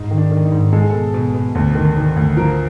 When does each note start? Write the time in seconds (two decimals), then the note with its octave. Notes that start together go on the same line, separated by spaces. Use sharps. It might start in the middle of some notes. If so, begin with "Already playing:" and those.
Already playing: G#2 D#4
0.11 D#3
0.18 D4
0.31 D#3
0.45 D#4
0.52 G#2
0.73 G#3 A4
0.82 G#4
0.90 B2 A4
1.14 B2
1.34 B2
1.55 D2
1.75 D#3
1.96 D#3
2.17 D2
2.37 F3 A#4